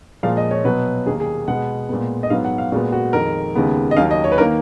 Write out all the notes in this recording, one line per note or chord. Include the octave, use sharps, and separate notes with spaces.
A#2 F3 G#3 F5
D#5
C#5
B2 F#3 B3 B4
D#2 D#3 A#3 G#4
G#4
B2 G#3 B3 F#5
A#2 G#3 B3
D#5
G#2 F#3 B3 F5
F#5
F5
A#2 G#3 B3 F#4
F#4
F2 D#3 G#3 A#4
D#2 C#3 G#3 B3
D#5
D#2 D#3 F#3 F5
D#5
C#5
B4
D#3 A#3 A#4